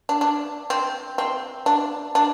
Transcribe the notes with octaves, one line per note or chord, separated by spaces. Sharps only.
D4
D4
C4
C4
D4
D4